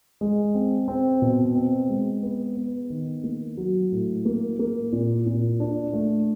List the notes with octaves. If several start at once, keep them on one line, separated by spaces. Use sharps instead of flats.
G#3
C4
C4
B2
C4
G#3
B3
B3
D#3
A#3
F#3
A2
A#3
A#3
A#2
A#2
D4
A3